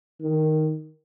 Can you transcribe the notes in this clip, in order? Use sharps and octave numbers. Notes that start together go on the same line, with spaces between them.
D#3